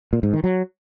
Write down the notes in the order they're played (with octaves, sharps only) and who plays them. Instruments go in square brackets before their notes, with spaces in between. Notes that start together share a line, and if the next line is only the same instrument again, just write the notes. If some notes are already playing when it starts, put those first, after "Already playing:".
[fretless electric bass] A#2
G#2
D#3
F#3